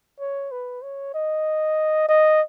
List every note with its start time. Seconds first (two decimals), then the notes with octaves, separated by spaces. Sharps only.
0.20 C#5
0.51 B4
0.82 C#5
1.14 D#5
2.09 D#5